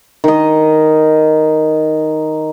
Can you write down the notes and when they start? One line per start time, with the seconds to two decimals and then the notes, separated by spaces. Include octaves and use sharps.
0.24 D#3 D#5